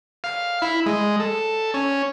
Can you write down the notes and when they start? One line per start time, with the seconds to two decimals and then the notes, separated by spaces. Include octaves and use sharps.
0.24 F5
0.62 E4
0.86 G#3
1.20 A4
1.74 C#4